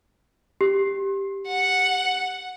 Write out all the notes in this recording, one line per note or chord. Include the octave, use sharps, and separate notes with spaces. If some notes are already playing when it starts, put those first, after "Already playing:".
G4
F#5